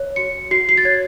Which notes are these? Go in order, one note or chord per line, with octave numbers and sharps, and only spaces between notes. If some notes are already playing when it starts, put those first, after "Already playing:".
Already playing: C#5
F#4 C#7
F#4 C7
C7
A6
C#5 G#6